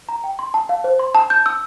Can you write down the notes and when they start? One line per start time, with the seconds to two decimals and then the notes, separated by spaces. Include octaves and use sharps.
0.09 A#5
0.24 G5
0.39 C6
0.54 A5
0.69 F5
0.84 C5
0.99 C6
1.15 A5
1.30 G6
1.46 E6